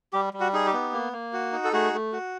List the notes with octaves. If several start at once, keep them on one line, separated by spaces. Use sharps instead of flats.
G3 G4
G3
F#4
D#4 G#4
G4
B3
A#3
A#3
F#4
D#4
A4
A3 F#4 G#4
A3
F#4